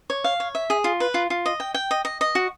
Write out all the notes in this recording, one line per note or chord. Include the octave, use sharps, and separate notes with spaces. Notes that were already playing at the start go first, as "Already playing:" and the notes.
C#5
F5
C#5
E5
G#4
F4
B4
F4
F4
D#5
G5
G5
D#5
D#5
D#5
F#4